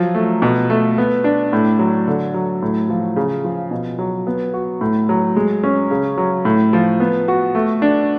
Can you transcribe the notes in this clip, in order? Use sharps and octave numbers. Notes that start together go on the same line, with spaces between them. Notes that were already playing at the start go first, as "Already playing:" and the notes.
Already playing: F3 F#3
A3
B2
A3
B3
D4
A2
F#3
D3
F#3
A2
F3
C#3
F3
B2
F#3
B3
F#4
A2
F#3
G#3
C#4
C#3
F#3
A2
F3
B3
F#4
A3
D4